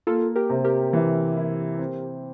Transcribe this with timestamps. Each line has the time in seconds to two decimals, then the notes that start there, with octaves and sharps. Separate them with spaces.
0.07 A#3 F4 A4
0.35 G4 A#4
0.50 C3
0.64 G4 A#4
0.93 E3
1.37 E4
1.79 C4